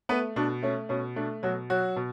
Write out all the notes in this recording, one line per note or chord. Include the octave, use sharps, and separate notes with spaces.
A3 B3 B4
B2 D4
A3 C#4
B2 C#4
A3 D4
B2 F#3 F#4
F#3 F#4
B2